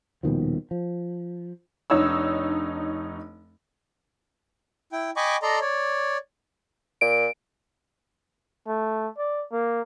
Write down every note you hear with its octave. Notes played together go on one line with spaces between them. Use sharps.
D#1 B2 D#3 F3
F3
F1 D4 D#4 C#5 E6
E4 G5
D#5 G5 G#5 B5 C#6 D6
A4 D5 D#5 A#5 C6
C#5 D5
A#2 D7
A3
D5
A#3